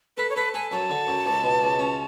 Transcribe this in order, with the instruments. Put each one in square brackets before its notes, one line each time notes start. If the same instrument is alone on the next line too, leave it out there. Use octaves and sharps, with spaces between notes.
[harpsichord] A4 [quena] B4
[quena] C#5
[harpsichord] A4 [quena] B4
[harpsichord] A4 [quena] G#5
[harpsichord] F#2 [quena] A5
[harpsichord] D3
F#2
C#2
B2
C#2
C#4